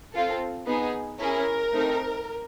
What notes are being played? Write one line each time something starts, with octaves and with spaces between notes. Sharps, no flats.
C4 F4 A4
B3 D#4 G#4
C#4 E4 G#4 A#4
A3 C4 D#4